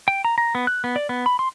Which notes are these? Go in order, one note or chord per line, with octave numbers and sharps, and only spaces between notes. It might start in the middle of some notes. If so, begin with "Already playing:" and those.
G5
A#5
A#5
B3
F#6
B3
D5
B3
B5
C6